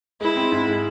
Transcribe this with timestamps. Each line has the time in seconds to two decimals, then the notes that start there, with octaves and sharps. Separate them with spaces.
0.21 G#3 E4
0.36 C4
0.52 G#2
0.68 G#3